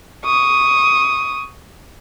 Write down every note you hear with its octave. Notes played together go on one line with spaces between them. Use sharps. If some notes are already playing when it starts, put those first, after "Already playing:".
C#6 D#6